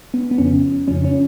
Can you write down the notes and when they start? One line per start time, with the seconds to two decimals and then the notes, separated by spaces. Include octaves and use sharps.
0.14 B3
0.31 B3
0.38 F2 C#3 F3 C#4
0.88 F2 C#3 F3 C#4
1.05 C#4